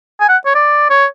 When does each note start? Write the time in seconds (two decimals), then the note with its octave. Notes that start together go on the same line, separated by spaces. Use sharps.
0.21 G#5
0.29 F#5
0.46 C#5
0.55 D5
0.90 C#5